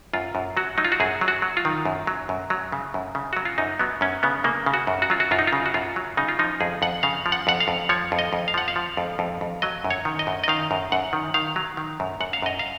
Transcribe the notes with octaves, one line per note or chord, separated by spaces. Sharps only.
F#2 F4
F#2
F#3 F#4
F#3 D#4
F4
F#4
F#2 G#4
F#3
F#4
F#3
F4
D#3
F#2
F#3
F#2
F#3
C#3
F#2
C#3
F#3 F#4
F4
F#2 D#4
F#3 B3
F#2 C#4
C#3 B3
C#3 A#3
C#3
F#4
F#2
F#4
F#3 F4
F#4
F#2 F4
D#4
F4
C#3
F#4
F#2 F4
F#3
C#3 D#4
F4
F3 D#4
F2 G#4
F2 F#5
C#3 F5
F3
F#5
F2 F#5
F5
F2
F3 C#5
F2
D#5
F2
F5
F3 F#5
F5
F3
F2
F2
F2
F#3 D#5
F#2
C#5
D#3
D#5
F#2
D#5
D#3 F5
F#2
F#2 F#5
D#3
D#3 F5
F#3
D#3
F#2
F#2 F#5
F5
F#2 D#5
F5